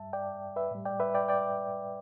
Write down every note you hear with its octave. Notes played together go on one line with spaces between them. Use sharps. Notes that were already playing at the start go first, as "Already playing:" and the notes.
Already playing: G2 G3 E5 A5
D5 G5
B4 E5
A2 G3
D5 G5
B4 E5
D5 G5
D5 G5